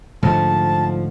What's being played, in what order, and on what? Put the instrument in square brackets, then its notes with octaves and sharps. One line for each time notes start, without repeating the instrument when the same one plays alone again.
[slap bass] G#2 D3 A3 [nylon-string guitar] F3 [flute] A5